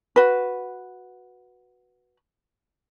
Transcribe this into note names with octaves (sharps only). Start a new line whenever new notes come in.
F#4 B4